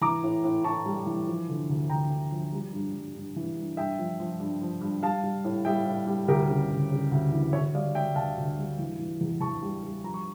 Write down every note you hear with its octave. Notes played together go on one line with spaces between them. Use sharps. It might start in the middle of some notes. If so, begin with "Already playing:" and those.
E3 A#5 D6
A2
A2
A2 A5 C#6
G3
E3
F3
D3
D2
D2 G5 A#5
D3
F3
G3
G2
G2
G2
E3
G2
G2 E5 G5
F3
F3
G2
F3
G2
G3 F5 A5
G3
A2
G3 E5 G5
A2
G3
D2 G4 A#4
C#3
D2
C#3
D2
E3
D2 C#5 E5
G3 D5 F5
G3 E5 G5
D2 F5 A5
D2
G3
E3
E3
E2
E2 A5 C#6
G3
G3
F3 A#5
C#6